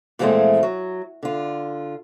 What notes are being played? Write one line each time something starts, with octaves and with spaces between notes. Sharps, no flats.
A#2 E3 F3 G#3 A3 C4
F#3
D3 F4